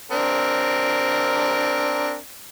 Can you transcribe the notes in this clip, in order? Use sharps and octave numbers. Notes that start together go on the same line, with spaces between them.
C4 D4 A#4